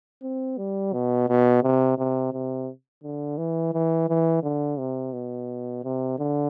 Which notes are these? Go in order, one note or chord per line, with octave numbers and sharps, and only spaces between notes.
C4
G3
B2
B2
C3
C3
C3
D3
E3
E3
E3
D3
C3
B2
C3
D3